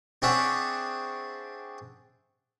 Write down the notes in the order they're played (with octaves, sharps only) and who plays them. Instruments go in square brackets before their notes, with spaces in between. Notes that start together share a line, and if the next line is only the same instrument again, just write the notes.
[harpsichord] C4 D4 G#4 C#5 E5 F#5